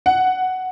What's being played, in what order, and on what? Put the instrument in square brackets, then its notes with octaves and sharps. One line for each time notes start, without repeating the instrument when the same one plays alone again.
[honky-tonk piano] F#5